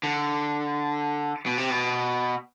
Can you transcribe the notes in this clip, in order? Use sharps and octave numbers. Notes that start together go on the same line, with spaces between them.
D3
B2
C3
B2